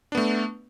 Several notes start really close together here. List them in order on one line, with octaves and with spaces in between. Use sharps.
D4 B3 A3